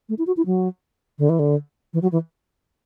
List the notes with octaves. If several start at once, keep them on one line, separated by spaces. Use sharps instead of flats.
A3
E4
F#4
E4
F#3
D3
E3
D3
E3
F#3
E3